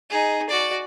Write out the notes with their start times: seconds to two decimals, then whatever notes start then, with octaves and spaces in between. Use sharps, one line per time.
0.10 D#4 G#4
0.49 F#4 D5